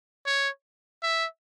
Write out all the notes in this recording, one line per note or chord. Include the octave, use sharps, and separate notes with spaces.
C#5
E5